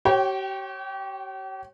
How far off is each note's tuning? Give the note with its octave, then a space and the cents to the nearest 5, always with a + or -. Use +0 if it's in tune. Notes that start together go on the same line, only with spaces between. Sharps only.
G4 -40 C#5 -20 G5 -10